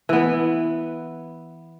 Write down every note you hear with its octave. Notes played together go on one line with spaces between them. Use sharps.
E3 B3